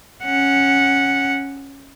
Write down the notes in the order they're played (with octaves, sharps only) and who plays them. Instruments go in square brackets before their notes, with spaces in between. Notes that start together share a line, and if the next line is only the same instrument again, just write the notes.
[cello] C#4 F#5